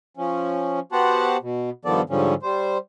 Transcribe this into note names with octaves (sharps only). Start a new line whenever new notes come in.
F3 C#4
B3 F#4 G4 C5 F#5 A5
B2
G2 D#3 F3 B3 A4 D5
G#2 D3 F3 G3 C#4
G3 C5